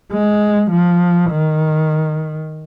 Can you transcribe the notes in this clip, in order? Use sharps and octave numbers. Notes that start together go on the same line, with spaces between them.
G#3
F3
D#3